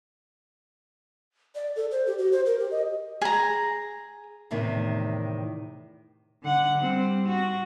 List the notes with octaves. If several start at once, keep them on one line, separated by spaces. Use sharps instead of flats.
D5
A4
C5
G4
F#4
C5
A#4
G4
D#5
G#4 A#5
E2 A2 C3 D#3
D3 F#5
G3 C4
F#4